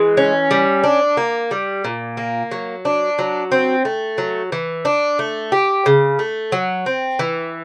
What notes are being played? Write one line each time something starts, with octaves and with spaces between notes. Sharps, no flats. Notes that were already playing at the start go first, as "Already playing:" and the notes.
Already playing: E3 G#3
C#4
G3
D4
A#3
G3
A#2
A#3
F#3
D4
F#3
C4
A3
F#3
E3
D4
A3
G4
C#3
A3
F#3
C4
E3